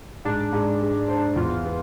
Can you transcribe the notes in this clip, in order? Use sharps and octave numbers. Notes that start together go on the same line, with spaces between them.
G#2 D4
G#2
G#3
C5
E2 F4
B3